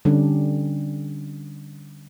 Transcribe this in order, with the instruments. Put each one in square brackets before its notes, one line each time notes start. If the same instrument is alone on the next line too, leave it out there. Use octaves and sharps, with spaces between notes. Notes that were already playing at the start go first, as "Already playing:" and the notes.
[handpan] D3 G3 C#4 D4